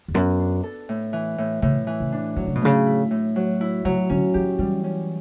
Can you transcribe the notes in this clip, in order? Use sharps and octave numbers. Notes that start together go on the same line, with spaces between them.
E2
F#2 B3
D4
A4
A2
E3
A2
A2 C#3
E3
C#3
D4
D3 F#3
C#3
B2
C#3 A3
E4
A2
F#3
E4
C#3 F#3
D3 C#4
E3 G4
E3 G3
C#4